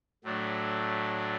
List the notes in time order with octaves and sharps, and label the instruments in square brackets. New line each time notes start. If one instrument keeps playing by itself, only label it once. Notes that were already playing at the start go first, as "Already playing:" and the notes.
[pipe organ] A2 F#3 A3 D4